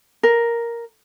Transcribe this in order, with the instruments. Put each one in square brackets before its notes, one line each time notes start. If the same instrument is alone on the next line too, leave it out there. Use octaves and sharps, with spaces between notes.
[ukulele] A#4